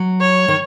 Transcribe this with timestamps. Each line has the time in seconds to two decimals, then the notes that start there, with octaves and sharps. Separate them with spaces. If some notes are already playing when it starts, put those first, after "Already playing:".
Already playing: F#3
0.21 C#5
0.48 D#3